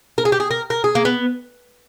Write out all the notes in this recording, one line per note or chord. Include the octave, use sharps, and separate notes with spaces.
A#4
G#4
G4
G#4
A#4
A#4
G#4
A#3
B3